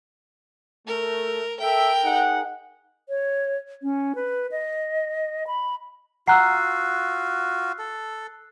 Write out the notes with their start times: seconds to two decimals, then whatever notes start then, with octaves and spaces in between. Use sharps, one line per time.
0.87 A3 A#4
1.60 A4 A#4 E5 G5
2.04 D#4 G#4 F#5
3.09 C#5
3.83 C#4
4.15 B4
4.51 D#5
5.47 B5
6.28 F4 F#4 F#5 A#5 E6 F#6 C7
7.79 A4